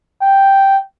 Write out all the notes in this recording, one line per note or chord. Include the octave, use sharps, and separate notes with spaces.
G5